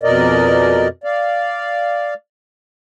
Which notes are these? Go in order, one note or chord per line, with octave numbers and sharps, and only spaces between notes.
F2 B2 A#4 D5 D#5
D5 F5